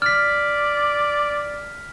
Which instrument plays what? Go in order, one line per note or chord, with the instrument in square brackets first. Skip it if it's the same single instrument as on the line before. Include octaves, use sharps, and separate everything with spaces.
[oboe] D5 [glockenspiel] F6 B6